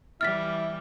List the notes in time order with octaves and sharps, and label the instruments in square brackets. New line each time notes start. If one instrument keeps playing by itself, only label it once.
[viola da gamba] E3 G3 [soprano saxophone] E4 [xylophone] F6 A6 B6